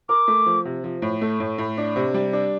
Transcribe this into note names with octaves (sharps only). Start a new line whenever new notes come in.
A#4 D6
A3
F3
C3
F3
A2
A3
A2
A2
D4
C3
G3
D4